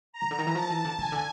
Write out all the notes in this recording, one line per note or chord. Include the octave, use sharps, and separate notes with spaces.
A#5
C#3
D3
D#3
E3
F3 A5
E3
D3
C#3 G#5
D3